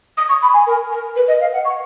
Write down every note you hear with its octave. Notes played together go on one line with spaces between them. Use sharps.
D#6
C#6
B5
G#5
A#4
A#4
B4
D#5
F5
F#5
C#6